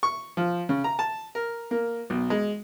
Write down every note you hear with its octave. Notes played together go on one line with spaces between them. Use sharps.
C#6
F3
C#3
A#5
A5
A#4
A#3
B1
G#3